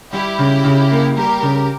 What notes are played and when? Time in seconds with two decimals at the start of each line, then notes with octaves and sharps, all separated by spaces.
0.12 G3 E4 G4
0.38 C#3
0.64 C#3
0.91 A#3
1.17 G3 G4 A#4
1.42 C#3